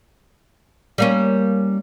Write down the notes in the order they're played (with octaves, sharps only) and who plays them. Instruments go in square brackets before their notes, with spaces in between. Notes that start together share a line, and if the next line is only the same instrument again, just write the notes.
[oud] G3 A#3 C#4